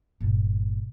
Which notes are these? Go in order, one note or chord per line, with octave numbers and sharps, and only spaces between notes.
G1 A#2